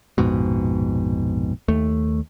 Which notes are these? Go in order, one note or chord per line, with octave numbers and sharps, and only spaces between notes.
A#1 F2 G#2 B2
D#2 A3